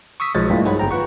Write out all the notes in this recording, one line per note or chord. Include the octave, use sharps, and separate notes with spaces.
C#6 D#6 E6 B6
B1 F3 F#3 G#3 A6
G2 G3 A3 A#3 E4 F4
D#4 G#4 C5 C#5 F#5 B5
G1 G5 A#5
F4 B4 F#5 C#6